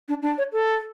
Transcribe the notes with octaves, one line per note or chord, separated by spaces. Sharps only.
D4
D4
C#5
A4